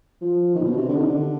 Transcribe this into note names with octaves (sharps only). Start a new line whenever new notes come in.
F3
D#3
A#2
B2
C3
D3
D#3
D3